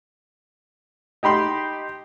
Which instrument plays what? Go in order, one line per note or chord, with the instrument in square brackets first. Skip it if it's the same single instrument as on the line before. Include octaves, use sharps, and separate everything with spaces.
[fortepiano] D#4 G4 B5 C6